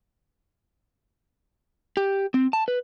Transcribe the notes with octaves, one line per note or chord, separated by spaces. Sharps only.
G4
C4
A5
B4